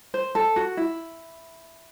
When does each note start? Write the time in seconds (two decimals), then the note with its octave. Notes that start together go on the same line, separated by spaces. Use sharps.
0.14 C5
0.35 A4
0.56 F#4
0.77 E4